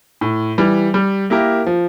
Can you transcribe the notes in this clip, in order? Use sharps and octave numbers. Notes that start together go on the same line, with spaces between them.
A2
E3 G3
G3
A#3 E4 G4 A#4
F3